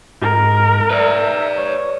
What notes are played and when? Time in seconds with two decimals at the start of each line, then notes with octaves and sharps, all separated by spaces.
0.22 G#2 A#4
0.90 B4 D5 E5
1.58 C#5